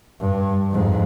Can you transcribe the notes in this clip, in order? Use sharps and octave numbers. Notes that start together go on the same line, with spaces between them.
G2
F2 G#2